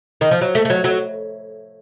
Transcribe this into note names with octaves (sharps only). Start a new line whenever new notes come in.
D#3
F3
F#3
A3
A3
F#3
F#3